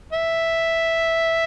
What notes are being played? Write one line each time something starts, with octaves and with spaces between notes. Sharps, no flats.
E5